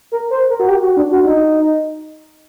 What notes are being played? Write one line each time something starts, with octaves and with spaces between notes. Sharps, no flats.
A#4
C5
A#4
F#4
G4
F#4
D4
F#4
D#4